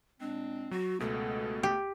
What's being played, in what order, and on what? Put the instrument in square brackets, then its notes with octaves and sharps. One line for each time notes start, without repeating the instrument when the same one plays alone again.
[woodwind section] A#2 G#3 C4 [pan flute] D4
[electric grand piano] F#3 [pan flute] F#4
[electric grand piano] C#2 B2 [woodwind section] G#3 B3 A4 [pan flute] A3
[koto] G4